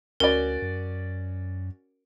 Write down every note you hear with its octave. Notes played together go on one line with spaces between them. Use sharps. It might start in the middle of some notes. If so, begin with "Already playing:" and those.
D2 C#4 F#4 A#4 D5
F#2